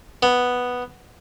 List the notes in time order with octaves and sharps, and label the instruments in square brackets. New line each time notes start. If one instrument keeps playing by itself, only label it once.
[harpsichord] B3